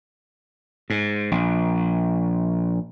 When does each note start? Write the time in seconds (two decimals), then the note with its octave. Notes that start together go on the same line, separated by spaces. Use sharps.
0.90 G#2
1.31 A#1